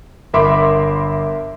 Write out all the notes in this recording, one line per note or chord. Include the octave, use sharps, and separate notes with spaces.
G1 A#4 E5 B5 C6 D6